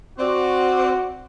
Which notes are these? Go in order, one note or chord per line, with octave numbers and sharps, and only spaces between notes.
C4 F#4 D5